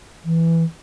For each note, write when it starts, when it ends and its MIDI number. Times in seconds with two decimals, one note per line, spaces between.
0.25 0.64 52